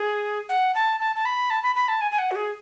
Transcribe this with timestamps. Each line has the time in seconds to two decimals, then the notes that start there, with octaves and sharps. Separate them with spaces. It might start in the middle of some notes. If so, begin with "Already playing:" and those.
Already playing: G#4
0.49 F#5
0.75 A5
1.00 A5
1.16 A5
1.25 B5
1.50 A5
1.63 B5
1.76 B5
1.88 A5
2.01 G#5
2.12 G#5
2.19 F#5
2.31 F#4
2.36 G#4